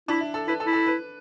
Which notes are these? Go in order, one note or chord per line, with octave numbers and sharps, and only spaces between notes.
D4 E4
E4
A4
E4 B4
A4
E4
A4
B4